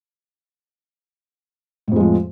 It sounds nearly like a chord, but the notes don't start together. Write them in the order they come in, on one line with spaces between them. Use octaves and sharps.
A2 F2 G#3 F3